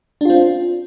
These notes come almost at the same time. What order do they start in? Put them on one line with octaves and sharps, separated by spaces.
D4 F4 C4